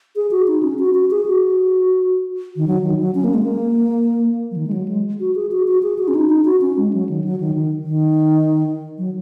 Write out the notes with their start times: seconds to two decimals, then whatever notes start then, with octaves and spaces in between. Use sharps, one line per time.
0.16 G#4
0.31 F#4
0.47 D#4
0.63 C#4
0.79 F#4
0.94 F#4
1.11 G#4
1.26 F#4
2.56 D#3
2.67 F#3
2.83 D#3
3.00 F#3
3.15 C#4
3.24 A#3
3.34 G#3
3.43 A#3
4.51 F#3
4.56 D#3
4.67 G#3
4.73 F#3
4.88 G#3
5.20 F#4
5.35 G#4
5.52 F#4
5.67 F#4
5.83 G#4
5.98 F#4
6.08 C#4
6.15 D#4
6.30 D#4
6.45 F#4
6.61 C#4
6.77 G#3
6.93 F#3
7.09 D#3
7.24 F#3
7.40 D#3
7.55 D#3
7.84 D#3
8.98 F#3